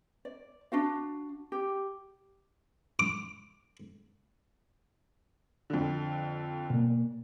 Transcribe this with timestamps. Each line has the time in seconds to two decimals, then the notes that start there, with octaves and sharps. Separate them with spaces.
0.25 D5
0.72 D4 F#4 F5
1.52 G4
2.99 D6
5.70 F2 D3
6.70 B2 A#3